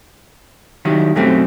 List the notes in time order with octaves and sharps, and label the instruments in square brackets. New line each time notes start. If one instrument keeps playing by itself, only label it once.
[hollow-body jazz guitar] D#3 F#3 G3 E4
F#2 B2 F#3 A3 C4